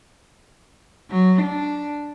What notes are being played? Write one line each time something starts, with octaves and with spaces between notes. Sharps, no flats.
F#3
D4